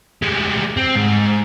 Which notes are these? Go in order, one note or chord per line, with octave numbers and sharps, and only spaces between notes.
G3 G#3
C4
G#2